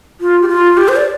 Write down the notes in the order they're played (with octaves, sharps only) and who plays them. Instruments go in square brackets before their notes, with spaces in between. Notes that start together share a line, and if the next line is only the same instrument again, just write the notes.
[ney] F4
G4
F4
G4
C5
D5